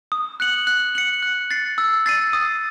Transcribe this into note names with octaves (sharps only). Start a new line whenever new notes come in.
D#6
F#6 C#7 F#7
F#6
C#7 F#7
F#6
A6 C7
E6
A6 C7 D#7
D#6